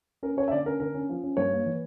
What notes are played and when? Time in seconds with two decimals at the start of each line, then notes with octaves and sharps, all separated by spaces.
0.23 C#4 A#4
0.37 C#4 C#5
0.48 E5
0.52 D3 D5
0.66 C#4 A#4
0.80 D3 A#4
0.94 C#4
1.09 F3
1.24 C#4
1.37 G2 C#5
1.51 A#3
1.66 E3